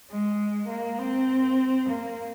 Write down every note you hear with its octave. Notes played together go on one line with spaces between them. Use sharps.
G#3
A#3
C4
A#3